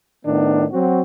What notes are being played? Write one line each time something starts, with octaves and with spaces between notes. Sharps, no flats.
A2 D#3 B3 D4
F#3 C4 F#4